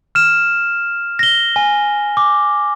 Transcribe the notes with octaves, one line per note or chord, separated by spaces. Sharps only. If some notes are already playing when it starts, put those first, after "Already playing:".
F6 E7
A#6 G7
G#5
D6